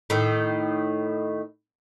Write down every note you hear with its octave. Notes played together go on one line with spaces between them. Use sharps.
A2 D#3